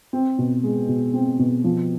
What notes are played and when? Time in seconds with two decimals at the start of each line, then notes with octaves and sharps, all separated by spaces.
0.13 C4
0.38 B2
0.63 G#3
0.88 B2
1.13 C4
1.39 B2
1.64 F3